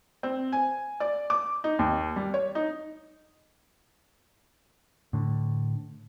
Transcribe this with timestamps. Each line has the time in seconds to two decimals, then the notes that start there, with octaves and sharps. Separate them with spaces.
0.23 C4
0.52 G#5
1.00 D5
1.30 D6
1.64 D#4
1.79 D#2
2.16 G3
2.34 C#5
2.55 D#4
5.13 A2 D3